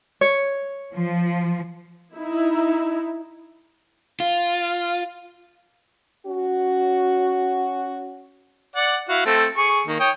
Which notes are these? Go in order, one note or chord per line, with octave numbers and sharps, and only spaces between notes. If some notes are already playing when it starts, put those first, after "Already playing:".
C#5
F3
D#4 E4
F4
C#4 F#4
D5 F#5
E4 F#4 F5
A3 C4 A4
G#4 C#6
D#3 A#3
C#5 G5 D#6